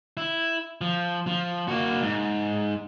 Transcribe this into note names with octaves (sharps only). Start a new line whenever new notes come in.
E4
F3
F3
A#3 F#4
G#2